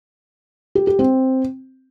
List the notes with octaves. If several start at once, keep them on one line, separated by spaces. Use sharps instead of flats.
G4
G4
C4